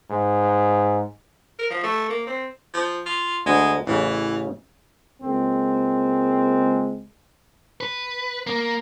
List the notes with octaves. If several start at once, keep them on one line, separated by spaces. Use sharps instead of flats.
G#2
A#4
F3
A3
A#3
C4
F3
F4
D2 G#3
A1 C#3 E3
C#2 G#3 A#3 C4
B4
A#3